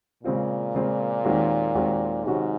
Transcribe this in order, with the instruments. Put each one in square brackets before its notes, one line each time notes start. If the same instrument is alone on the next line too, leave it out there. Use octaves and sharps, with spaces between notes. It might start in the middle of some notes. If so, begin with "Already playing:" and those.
[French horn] A#2 [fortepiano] C#3 G#3 C4 F4
[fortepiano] C#3 G#3 C4 F4
D#2 D#3 G#3 C4 F#4
D#2 D#3 G#3 C4 F#4
[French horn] G#2 [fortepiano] C3 D#3 F#3 C#4 F#4